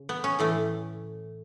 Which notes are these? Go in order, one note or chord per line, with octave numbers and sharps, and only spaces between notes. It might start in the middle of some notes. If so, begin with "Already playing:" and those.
Already playing: C#3
B3
C#4
A2 E3 A3